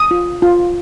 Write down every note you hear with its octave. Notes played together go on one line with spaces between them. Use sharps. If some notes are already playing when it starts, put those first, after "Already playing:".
Already playing: D#6
F4
F4